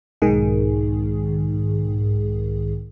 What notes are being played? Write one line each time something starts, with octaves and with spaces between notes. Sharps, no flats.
B1 G#2 D#3 G#4